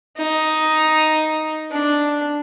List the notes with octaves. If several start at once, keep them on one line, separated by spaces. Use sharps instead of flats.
D#4
D4